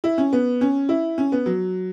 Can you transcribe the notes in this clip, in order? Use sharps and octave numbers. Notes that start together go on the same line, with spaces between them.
E4
C#4
B3
C#4
E4
C#4
B3
F#3